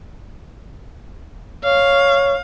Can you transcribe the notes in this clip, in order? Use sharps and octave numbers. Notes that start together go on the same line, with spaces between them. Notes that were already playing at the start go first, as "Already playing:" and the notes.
C#5 F5